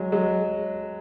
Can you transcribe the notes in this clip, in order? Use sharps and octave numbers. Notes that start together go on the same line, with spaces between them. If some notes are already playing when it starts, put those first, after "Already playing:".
Already playing: F#3 G#3
F#3 G#3